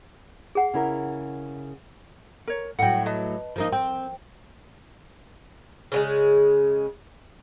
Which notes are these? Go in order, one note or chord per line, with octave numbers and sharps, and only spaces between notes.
G#4 F#5
C#3 E4 A#4
A#4 C#5
A2 F#3 F#5 G5
B4 D#5 A5
F3 A#3 D#4
C4 G5
C#3 F#3 G#3